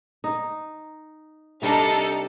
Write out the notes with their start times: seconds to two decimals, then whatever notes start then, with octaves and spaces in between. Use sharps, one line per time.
0.24 D#4
1.62 C3 G3 D4 D#4 A4 A#4